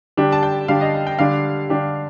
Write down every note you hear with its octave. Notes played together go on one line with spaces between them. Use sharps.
D3 G3 D4 G4
A5
G5
D3 G3 D4 G4 F5
D#5
G5
G5
D3 G3 D4 G4 F5
D3 G3 D4 G4